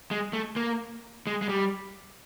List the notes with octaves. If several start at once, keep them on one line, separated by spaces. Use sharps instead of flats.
G#3
A3
A#3
G#3
G#3
G3